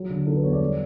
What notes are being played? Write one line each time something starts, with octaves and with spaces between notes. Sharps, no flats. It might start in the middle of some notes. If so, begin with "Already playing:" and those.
Already playing: F#3
D3
F#3 A4
B4
E2 C#5
D5
G3